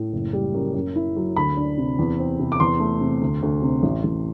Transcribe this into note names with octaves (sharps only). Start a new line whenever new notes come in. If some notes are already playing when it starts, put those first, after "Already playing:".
Already playing: A2
F#1
G3
F#2
F#2
E4
F#3
D2 B5
D4
C3
E2
C4
C3
D6
E2 C6
A3
C3
D2
D2
C3
A1
A1